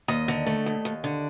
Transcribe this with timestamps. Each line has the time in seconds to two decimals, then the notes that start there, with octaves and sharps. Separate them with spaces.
0.08 D#2 D#5
0.28 D3
0.46 A3
0.66 D#2
0.85 D#2
1.04 D3